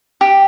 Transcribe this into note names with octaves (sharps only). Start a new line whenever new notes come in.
G4